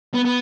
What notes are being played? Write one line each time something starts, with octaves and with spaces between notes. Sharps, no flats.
B3
B3